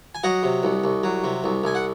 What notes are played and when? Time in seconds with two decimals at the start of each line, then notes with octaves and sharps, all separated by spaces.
0.15 G#5
0.23 F#3 D#5 F#5
0.43 C3
0.63 C2
0.84 C2
1.04 F#3
1.24 C3
1.44 C2
1.64 C2 G#5
1.75 F#5